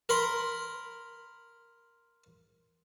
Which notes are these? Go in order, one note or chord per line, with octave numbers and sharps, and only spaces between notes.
A#4 B5 C6